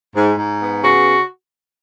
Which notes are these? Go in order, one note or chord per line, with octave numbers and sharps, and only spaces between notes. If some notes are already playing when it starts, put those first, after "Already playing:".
G#2
G#2
B3
C#3 F#4